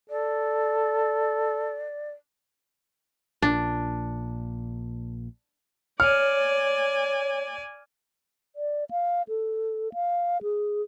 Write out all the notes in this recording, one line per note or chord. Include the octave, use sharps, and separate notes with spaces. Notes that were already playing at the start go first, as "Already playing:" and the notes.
A4 D5
A#1 A#2 D4
C#5 D5 G#5 F6
D5
F5
A4
F5
G#4